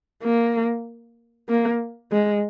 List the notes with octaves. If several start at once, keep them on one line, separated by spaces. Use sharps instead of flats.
A#3
A#3
G#3